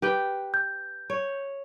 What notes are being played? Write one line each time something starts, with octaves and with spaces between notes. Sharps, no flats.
G4 B4 G5
G6
C#5